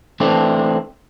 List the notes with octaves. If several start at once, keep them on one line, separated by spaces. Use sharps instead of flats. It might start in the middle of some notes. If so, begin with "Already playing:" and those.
E3 A3 C4 D4